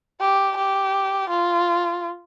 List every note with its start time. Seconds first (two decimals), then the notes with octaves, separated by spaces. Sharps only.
0.21 G4
0.57 G4
1.29 F4